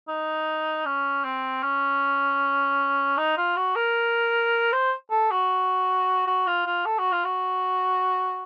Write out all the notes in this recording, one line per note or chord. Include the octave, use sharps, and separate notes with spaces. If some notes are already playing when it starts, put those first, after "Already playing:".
D#4
C#4
C4
C#4
D#4
F4
F#4
A#4
C5
A4
F#4
F#4
F4
F4
A4
F#4
F4
F#4